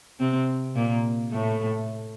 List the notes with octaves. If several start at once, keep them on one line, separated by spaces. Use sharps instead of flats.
C3 C4
A#2 A#3
A2 A3